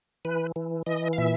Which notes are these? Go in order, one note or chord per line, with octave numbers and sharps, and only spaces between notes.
E3 B4
E3
E3 D#5
F5
A#2 E5